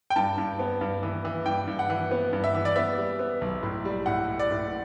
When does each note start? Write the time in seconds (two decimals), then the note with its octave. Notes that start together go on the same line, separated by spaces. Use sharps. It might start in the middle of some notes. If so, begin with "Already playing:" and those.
0.10 G5
0.16 G2 A5
0.38 G2
0.59 B3
0.81 G2
1.03 E3
1.25 E3
1.45 G2 G5
1.67 G2
1.79 F#5
1.90 E3
2.11 B3
2.33 G2
2.44 E5
2.55 E3
2.65 D5
2.76 B3 E5
2.97 G3
3.19 B3
3.41 B1
3.63 A2
3.85 G3
4.06 A2 F#5
4.28 A2
4.39 D5
4.50 A2